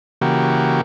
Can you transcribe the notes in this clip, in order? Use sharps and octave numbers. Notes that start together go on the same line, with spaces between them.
C#3 E3 A#3 F#4 G4